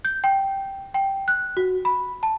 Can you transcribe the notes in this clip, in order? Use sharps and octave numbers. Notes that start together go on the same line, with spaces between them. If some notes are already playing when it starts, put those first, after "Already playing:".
G6
G5
G5
F#6
F#4
B5
A5